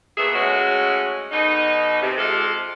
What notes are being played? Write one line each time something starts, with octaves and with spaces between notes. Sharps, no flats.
A#2 A3 B3 G#4 E5
G#3 A3 C#4 F#4
B2 D3 D#4
C3
G#3 C4 F4 G4 A4